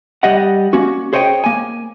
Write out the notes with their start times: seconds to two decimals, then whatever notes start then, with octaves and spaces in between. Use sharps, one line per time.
0.23 G3 D#5 F#5
0.73 A#3 C#4 F#4
1.13 G#4 C5 C#5 D#5 G5
1.44 A#3 G#5